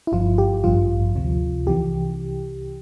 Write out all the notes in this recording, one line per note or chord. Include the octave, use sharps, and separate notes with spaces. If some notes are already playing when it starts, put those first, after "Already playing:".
E4
G1 G2 F3 F4
G4
A1 G2 F3 F4
D2 C3 F3
C2 C3 E3 G4